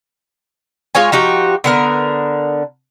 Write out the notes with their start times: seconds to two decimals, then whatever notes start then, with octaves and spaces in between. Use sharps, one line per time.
0.95 G#3 F4 C#5 G#5
1.12 F3 D#4 F#4 G4
1.64 D3 B3 A#4